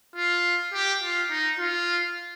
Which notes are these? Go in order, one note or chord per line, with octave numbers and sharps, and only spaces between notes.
F4
G4
F4
D#4
F4